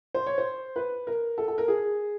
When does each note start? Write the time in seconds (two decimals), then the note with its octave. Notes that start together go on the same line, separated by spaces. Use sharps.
0.14 C5
0.26 C#5
0.38 C5
0.76 B4
1.07 A#4
1.38 A4
1.48 A4
1.58 A#4
1.68 G#4